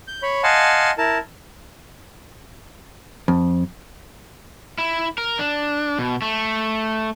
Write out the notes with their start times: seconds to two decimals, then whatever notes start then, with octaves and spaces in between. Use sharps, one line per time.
0.08 G6
0.22 C#5 B5
0.43 D#5 F5 F#5 G#5 A5 C6
0.98 E4 A#4 A5
3.28 F2
4.78 E4
5.18 A#4
5.39 D4
5.99 B2
6.22 A3